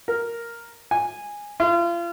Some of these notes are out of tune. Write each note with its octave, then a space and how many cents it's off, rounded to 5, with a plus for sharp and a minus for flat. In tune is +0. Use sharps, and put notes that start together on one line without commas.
A#4 +0
G#5 -10
F4 -35